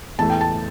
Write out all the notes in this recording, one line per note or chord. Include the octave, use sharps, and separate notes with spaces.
E2 E3 A3 A5
G5
A5